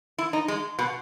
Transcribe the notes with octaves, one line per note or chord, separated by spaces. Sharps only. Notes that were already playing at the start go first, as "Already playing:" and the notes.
E4
D#4
G#3
B2